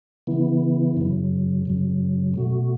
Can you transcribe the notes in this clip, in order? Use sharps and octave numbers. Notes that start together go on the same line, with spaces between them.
C#3 E3 B3 E4
F#2 C#3 F#3
F#2 C#3 F#3
B2 A3 F#4